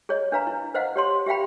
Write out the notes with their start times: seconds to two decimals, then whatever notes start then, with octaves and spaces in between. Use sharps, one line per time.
0.09 G#4 C#5 D#5
0.32 D4 B4 F5 A#5
0.47 E4
0.74 B4 C5 D#5 F5 F#5
0.96 G4 C#5 C6
1.26 G4 E5 F5 G5 B5